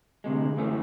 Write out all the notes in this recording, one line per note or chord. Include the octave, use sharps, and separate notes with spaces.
D2 C3 G#3
F#2 E3 A3 C#4